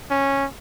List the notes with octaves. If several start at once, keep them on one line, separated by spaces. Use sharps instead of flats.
C#4